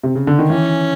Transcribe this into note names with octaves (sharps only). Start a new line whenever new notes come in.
C3
C#3
D3
D#3
E3 C#4